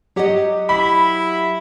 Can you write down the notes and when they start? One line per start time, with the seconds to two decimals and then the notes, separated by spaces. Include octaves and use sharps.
0.16 F#3 G4 C#5 D#5 F#5
0.69 E4 B5